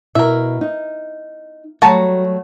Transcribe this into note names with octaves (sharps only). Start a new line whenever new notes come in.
B2 E4 A#4 E5
D#4
F#3 G3 A3 F#4 A5 A#5